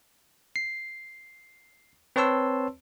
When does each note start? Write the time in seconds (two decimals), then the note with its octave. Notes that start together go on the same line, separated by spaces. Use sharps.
0.56 C7
2.16 C4 B4 C#5 A5 C6 E6